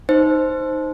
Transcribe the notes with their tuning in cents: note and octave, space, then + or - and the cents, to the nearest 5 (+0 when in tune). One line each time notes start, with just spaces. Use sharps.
D#4 +0 C5 +0